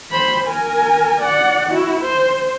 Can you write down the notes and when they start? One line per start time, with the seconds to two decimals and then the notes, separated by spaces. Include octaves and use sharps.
0.11 C5 B5
0.47 A#4 G#5
1.21 D5 F#5
1.70 E4 F#4
2.01 C5